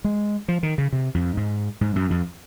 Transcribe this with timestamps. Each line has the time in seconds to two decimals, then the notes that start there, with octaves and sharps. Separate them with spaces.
0.04 G#3
0.48 F3
0.63 D#3
0.78 C#3
0.93 C3
1.15 F2
1.37 G#2
1.81 G#2
1.96 F#2
2.10 F2